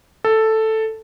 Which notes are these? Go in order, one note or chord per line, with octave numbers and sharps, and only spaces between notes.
A4